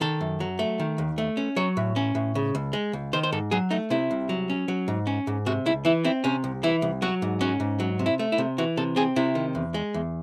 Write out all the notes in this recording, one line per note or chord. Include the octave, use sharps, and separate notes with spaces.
D#3 A4
F#2
F#3
A3
D#3
D#2
A3
C#4
F#3 C#5
A2
C#4
A2
C#3
C#2
G#3
C#2
D#3 C5
C5
G#2 A4
F#3 G#4
A3 D#4
C3 E4
C2
F#3
C#4
F#3
G#2
C#4
G#2
C3 F#4
C#2 E4
E3 E4
C4 E4
C3 C#4
C2
E3 E4
C2
F#3 F#4
G#2
C#4 F#4
G#2
F#3
C3
E4
A3
E4
C3
E3 F#4
C3 A4
C4 G#4
C3 E4
D#3
E2
G#3
E2